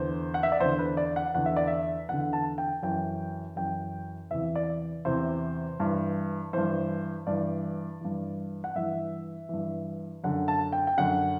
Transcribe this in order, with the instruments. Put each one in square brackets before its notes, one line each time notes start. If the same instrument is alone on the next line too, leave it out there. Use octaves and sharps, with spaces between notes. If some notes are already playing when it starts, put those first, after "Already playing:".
Already playing: [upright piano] E2 D3 C5
F#5
E5
D5
E2 D3 C5
B4
D5
F#5
E2 D3 F#5
E5
D5
E5
E2 D3 F#5
A5
G5
F#2 E3 G5
F#2 E3 G5
E2 C3 E3 E5
D5
E2 C3 E3 C5
G2 E3
G2 E3 C5
G2 E3 D5
G2 E3
F#5
G2 E3 E5
G2 E3
F#2 D3 F#5
A5
G5
G5
F#2 D3 F#5